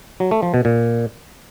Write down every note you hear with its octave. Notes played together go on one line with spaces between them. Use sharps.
F#3
A3
F3
B2
A#2